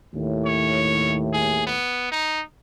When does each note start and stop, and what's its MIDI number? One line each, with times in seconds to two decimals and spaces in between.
0.13 1.77 39
0.13 1.77 45
0.46 1.16 73
1.33 1.64 68
1.67 2.09 59
2.12 2.41 63